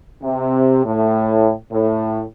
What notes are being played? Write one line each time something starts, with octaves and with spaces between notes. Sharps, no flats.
C3
A2
A2